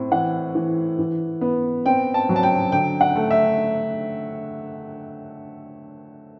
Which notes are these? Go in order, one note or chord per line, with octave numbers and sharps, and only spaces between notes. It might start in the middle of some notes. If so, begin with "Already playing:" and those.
Already playing: A2 C4
E3 F#5
E3
E3
B3
C4 G5
A5
F#3
A5
G5
D3 G5
F#5
A3
E5